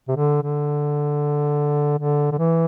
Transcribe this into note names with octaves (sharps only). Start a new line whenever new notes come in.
C3
D3
D3
D3
D3
E3